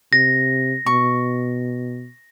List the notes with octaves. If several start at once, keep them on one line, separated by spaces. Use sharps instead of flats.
C3 A#6
B2 C#6